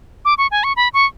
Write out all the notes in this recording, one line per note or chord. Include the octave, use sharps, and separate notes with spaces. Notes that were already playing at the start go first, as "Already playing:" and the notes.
D6
C#6
G#5
C#6
B5
C#6